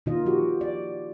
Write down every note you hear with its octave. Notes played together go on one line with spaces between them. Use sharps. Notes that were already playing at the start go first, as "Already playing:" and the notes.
A#2 D#3 D#4 F4 D#5
F3 F#4 G4
D5